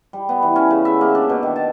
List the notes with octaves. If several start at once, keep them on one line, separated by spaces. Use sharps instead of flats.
G3
B3
E3
C#4
C#3
E5
A#3
D4
B2
D#3
A5